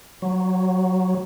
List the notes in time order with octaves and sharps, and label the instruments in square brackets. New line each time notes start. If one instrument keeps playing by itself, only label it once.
[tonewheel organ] F#3